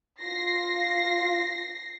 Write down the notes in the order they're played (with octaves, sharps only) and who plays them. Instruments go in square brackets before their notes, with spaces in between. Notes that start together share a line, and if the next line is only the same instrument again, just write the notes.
[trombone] F4 [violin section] A#6 C7